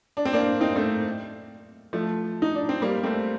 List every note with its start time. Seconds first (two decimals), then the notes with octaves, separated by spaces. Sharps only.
0.17 D4
0.25 C4
0.33 A#3 D4
0.61 C4 D#4
0.76 A3 C4
1.93 F3 A3
2.42 D#4
2.55 D4
2.69 C4
2.82 G3 A#3
3.03 A3 C4